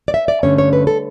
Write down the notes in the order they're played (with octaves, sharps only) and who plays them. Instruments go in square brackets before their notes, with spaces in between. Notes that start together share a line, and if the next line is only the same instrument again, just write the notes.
[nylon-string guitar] D5
E5
D5
G2 D3 A3 C#4 C#5
C#5
B4
A4